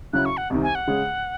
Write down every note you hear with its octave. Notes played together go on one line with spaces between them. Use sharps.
C#3 F#3 C#4 E4 F#6
C#6
F#5
C2 C3 D#3
G#5
F#5
C#3 G#3 C#4 G#4